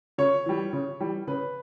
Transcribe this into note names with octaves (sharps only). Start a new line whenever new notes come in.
C#3 C#5
E3 G3
C#3
E3 G3
C#3 B4